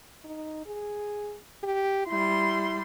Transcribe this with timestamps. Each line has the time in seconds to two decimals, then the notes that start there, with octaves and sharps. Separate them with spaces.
0.24 D#4
0.66 G#4
1.63 G4
2.07 G3 E4 C6